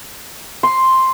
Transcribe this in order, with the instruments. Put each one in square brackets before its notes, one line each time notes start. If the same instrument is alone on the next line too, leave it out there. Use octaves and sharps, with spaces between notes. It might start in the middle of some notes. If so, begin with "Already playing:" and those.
[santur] C6